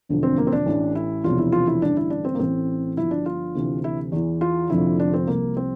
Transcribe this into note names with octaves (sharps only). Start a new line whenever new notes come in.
E1 D2 D3 F3
C4
A#3
C4
D4
A1 A2 E3
E4
E1 E2 C3 F3 F4
E4
F4
E4
A1 G2 D3 D4
E4
D4
C4
A#3
A1 A2 E3 C4
G1 G2 D3 F3 E4
D4
F4
D2 C3 E3
E4
E2 E3
F4
F1 F2 D3 F3 E4
D4
C4
C2 C3 F3 A#3
C4